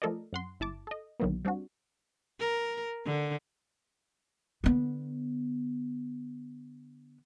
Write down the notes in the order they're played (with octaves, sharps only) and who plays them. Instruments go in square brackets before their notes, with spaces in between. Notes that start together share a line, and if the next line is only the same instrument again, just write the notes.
[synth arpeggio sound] F3 A3 A4 A#4 D5 D#5
F#2 F#5 C6
G1 E4 A5 D6
A4 D#5
B1 D3 D#3 F#3 A#3 B3
G3 C4 D4 F#4
[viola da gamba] A#4
D3
[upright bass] D3 B3